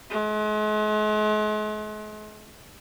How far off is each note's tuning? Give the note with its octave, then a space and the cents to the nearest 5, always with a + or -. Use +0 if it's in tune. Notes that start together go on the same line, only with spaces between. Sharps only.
G#3 +45